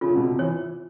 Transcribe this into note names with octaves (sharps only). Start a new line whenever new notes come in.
C#3 F4
C3
B2
C3
E3 C#5